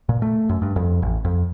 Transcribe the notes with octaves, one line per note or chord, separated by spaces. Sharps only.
A#2
A3
F#2
G2
F2
A1
F2